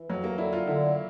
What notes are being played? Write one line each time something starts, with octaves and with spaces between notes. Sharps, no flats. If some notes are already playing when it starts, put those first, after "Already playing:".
Already playing: E3
F2 F#3
A#3
D3 E4
F4
D3 E4